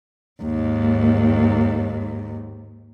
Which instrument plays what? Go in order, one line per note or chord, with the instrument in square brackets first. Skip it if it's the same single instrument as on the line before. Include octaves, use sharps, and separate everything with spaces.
[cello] D#2 G#2